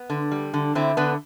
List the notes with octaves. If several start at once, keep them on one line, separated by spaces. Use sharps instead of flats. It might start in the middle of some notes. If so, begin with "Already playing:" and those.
Already playing: B3
D3
G3
D3
D3 C4 E4
D3 B3 D4